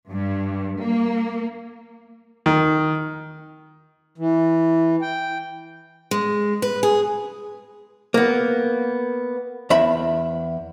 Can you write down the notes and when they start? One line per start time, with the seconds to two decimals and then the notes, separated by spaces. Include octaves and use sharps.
0.11 G2
0.80 A#3
2.46 D#3
4.18 E3
5.02 G5
6.11 G#3
6.62 B4
6.83 G#4
8.14 A#3 B3
9.70 E2 E5 B5